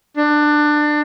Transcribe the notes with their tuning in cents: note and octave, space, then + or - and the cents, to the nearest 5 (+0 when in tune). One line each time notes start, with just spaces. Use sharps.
D4 +20